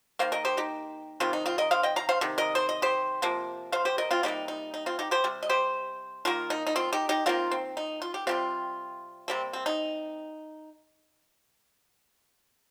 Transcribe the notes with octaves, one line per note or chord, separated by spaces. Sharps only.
D#3 A#3 C5 F5
A#4 D#5
G4 C5
D#4 G4
C3 D#3 G3 C4 F4
D#4
C4 F4
A#4 D#5
C5 F5
D#5 G5
F5 A#5
C5 F5
C3 D#3
A#4 D#5
C5
D#5
G4 C5
C3 F3 A#3
C5 F5
G4 C5
A#4 D#5
C4 F4
C3 D#3 G3 A#3 D#4
D#4
D#4
C4 F4
D#4 G4
G4 C5
C3 G3
D#5
G4 C5
D#3 A#3 F4 A#4
D#4
D#4
C4 F4
D#4 G4
D#4 G4
D#3 G3 A#3 C4 F4
C4
D#4
F4
G4
C3 D#3 G3 C4 F4
C3 G3 A#3 C4
C4
D#4